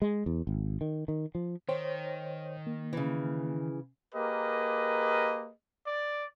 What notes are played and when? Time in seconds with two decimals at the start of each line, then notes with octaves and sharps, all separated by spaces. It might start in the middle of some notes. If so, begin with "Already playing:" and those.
0.02 G#3
0.26 E2
0.47 G#1
0.81 D#3
1.08 D#3
1.35 F3
1.69 D#3 C5 C#5 G5
2.67 A#3
2.93 C#3 E3
4.15 A#3 G4 G#4 A#4 B4 D#5
5.87 D5